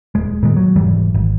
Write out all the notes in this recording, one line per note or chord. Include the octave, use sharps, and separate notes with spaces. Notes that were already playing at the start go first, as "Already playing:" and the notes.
D#1 G#3
A#2 D#3 G#3
F#3
F1 G#2 E3 G3
G#1